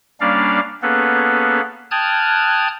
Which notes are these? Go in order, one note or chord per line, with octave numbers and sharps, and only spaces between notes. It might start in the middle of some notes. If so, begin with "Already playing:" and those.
G3 A#3 C#4 D4 D5 F5
A#3 B3 C#4 G#4 A4 B4
G5 A5 D#6 F6 F#6 G#6